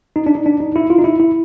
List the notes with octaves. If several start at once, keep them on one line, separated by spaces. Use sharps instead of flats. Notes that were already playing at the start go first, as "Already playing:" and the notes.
D#4
D4
D#4
D4
D#4
E4
F4
D#4
E4
E4